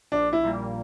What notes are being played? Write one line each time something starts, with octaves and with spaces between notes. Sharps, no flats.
A#1 D4
E4
A#2 G3 A#3